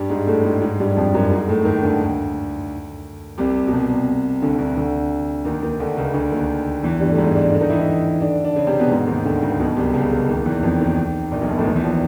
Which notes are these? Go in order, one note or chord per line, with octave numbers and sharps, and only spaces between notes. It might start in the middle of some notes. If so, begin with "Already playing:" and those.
Already playing: G2 G3
G#2 G#3
A2 A3
G#2 G#3
G#2 G#3
G2 G3
F2 F3
F#2 F#3
G#2 G#3
A2 A3
D#2 D#3
D2 D3
C2 C3
B2
C2 C3
D2 D3
D2 D3
D2 D3
D#2 D#3
D#2 D#3
D2 D3
C#2 C#3
D2 D3
D#2 D#3
E2 E3
G2 G3
A3
G#2 G#3
D3 D4
D3 D4
D#3 D#4
E3 E4
D#3 D#4
D3 D4
D3 D4
C#3 C#4
C3 C4
B2 B3
G#2 G#3
D#2 D#3
D2 D3
C#2 C#3
B1 B2
C2 C3
C#2 C#3
C#2 C#3
D#2 D#3
E2 E3
F2 F3
D#2 D#3
A#1 A#2
B1 B2
A#1 A#2
A1 A2
D#2 D#3
E2 E3
F3